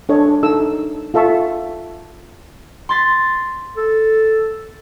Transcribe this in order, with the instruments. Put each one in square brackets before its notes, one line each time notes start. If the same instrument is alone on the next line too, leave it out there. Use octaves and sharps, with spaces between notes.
[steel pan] D4 A4 C#5 D#5
D#4 A4 E6
F4 A4 E5 A5 C#6
[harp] C6 A6 B6
[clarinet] A4